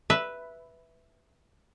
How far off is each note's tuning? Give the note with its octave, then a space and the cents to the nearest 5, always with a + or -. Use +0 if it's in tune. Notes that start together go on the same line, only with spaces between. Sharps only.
B4 +0 E5 +0